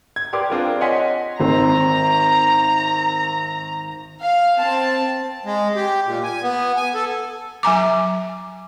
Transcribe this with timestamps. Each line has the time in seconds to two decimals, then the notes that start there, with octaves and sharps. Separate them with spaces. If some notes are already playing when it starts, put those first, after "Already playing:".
0.16 G#6
0.33 G4 A#4 B4 D5 C6 D6
0.50 C4 D4 F4 G#4 A#4
0.81 C#5 D#5 F#5 G#5 C6 B6
1.40 G#1 C4 A#5
4.22 F5
4.58 C4 A5
5.45 G#3
5.76 G4
6.06 A#2
6.24 G#5
6.42 B3
6.76 G#5
6.94 A4
7.63 F#3 G#5 A#5 D6